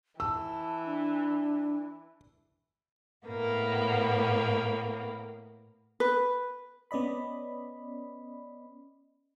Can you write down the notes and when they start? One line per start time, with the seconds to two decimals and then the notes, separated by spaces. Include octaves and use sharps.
0.20 E3 A5 E6
0.86 D4
3.27 A2 A#3 B3
6.00 B4
6.91 B3 C#4 D5 D#5 B5